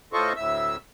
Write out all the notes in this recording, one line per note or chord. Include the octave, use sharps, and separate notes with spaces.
A2 F4 A4 C5 D#5 C#6
D2 A2 E5 E6